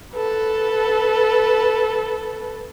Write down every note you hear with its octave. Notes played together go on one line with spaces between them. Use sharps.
A4 B4